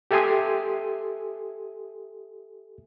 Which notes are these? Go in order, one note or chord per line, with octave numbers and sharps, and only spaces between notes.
G4 A4 E5 G#5 C6 D#6